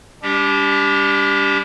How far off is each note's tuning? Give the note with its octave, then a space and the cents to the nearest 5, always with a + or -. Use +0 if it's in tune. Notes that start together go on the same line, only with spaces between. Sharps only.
G3 +30 D4 -35 G4 +0